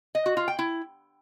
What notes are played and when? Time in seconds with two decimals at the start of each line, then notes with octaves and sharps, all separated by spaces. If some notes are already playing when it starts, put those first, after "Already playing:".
0.15 D#5
0.26 F#4
0.37 F4
0.48 G5
0.59 E4